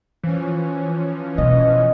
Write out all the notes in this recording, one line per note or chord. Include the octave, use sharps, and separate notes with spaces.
E3 F3 C#4
B2 D#5